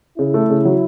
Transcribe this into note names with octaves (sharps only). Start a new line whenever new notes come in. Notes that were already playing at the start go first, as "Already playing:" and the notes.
C#3 E4
A3
C#3
F#3